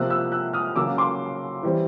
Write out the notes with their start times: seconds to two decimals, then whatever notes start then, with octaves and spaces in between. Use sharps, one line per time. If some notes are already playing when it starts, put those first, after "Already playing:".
Already playing: C3 F3 A#3 E6 F#6
0.10 E6 F#6
0.32 E6 F#6
0.53 D#6 F6
0.76 C#3 F#3 A#3 C#4 D6 E6
0.98 C6 D6
1.63 E3 G3 C4